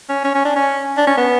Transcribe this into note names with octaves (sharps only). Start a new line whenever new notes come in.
C#4
C#4
C#4
D4
C#4
D4
C#4
B3